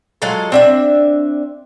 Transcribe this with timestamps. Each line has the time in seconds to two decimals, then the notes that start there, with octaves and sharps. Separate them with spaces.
0.22 F#3 G#3 F4 A4
0.52 C4 D4 E5